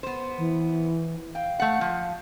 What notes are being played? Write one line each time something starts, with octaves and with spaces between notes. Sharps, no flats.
B3 C5
E3
F5 G5
A3 F#5
F3